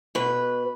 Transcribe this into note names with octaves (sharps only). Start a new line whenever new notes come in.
B2 B4